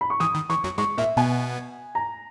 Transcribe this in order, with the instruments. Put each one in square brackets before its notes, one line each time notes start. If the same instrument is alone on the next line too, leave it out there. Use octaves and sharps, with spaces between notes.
[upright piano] B5
C#6
[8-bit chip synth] E3 [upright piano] D#6
[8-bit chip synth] D#3
[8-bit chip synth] E3 [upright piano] C#6
[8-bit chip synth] F#2 F#3
[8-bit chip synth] G#2 G#3 [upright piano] C#6
[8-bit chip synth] A#2 A#3 [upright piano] E5
[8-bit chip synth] B2 B3 [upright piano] G#5
[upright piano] A#5